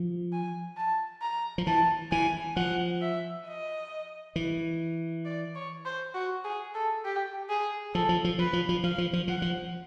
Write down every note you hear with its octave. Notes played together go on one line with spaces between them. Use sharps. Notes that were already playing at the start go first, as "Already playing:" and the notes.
Already playing: F3
G#5
A5
A#5
F3
E3 A5
E3 G#5
F3 F#5
E5
D#5
E3
D5
C#5
C5
F#4
G#4
A4
G4
G#4
F3 A4
F3
F3
F3 B4
F3
F3
F3 F5
F3
F3
F3 F#5
F3